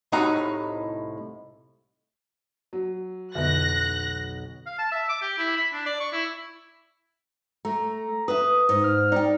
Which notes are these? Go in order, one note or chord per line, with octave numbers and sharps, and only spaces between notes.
C2 A2 C3 D#4 F#4 A#5
F#3
B1 F2 D3 B3 E5 F#6 A#6
F5
A5
E5
D6
G4
E4
B5
D4
D5
C#6
E4
A3 A#5
B4 E5 D#6
G#2
F6
D#4 D5 G5